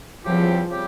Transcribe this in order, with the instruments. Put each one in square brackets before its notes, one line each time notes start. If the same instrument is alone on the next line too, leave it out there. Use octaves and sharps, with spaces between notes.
[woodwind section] E2 C#3 G3 C4 G4 [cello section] F3
[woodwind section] C#3 G3 C4 G4